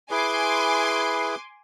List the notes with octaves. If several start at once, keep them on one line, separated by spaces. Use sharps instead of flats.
E4 G#4 B4 G#5 C6 D6